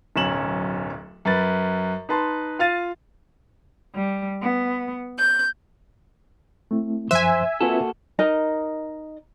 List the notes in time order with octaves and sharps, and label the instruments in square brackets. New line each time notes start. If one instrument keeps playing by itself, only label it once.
[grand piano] D1 B1 C#4 E7 F#7
F#2 B4 A6
D#4 B4 A5 C6
F4 F5 A6 D#7
[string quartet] G3
B3
G6
[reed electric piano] A3 C4 E4
[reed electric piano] F#2 F3 F#6 [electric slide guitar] C5 [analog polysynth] E5 G#5
[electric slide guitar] A#3 F#4 A4 [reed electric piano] C4 F4 B4
[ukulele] D#4 A#4 D#5 A#5